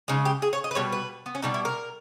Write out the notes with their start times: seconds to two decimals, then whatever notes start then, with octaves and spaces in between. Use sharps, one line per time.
0.08 C#3 G#3 D#4
0.25 G4
0.42 G#4
0.53 C#5
0.64 D#5
0.71 B4
0.75 B2 G3 C#5
0.92 B4
1.26 B3
1.35 C#4
1.42 B2 G3 D#4
1.54 E4
1.65 A#4